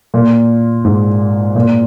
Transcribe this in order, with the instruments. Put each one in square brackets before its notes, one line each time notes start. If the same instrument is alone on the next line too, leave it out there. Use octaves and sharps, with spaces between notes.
[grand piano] A#2
G#2
A#2